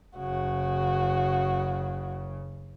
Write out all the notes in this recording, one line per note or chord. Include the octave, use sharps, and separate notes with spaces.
F#1 C#3 F#4